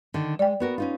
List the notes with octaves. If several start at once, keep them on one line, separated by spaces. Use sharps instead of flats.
D3 D#3
G#3 D5 G5
B3 F#4 A#4
C#4 D#4 F4